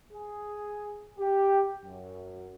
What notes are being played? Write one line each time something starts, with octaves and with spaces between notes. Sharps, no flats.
G#4
G4
F#2